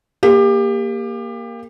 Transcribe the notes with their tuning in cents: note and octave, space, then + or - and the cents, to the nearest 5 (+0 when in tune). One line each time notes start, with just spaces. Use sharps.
A#3 +0 G4 +25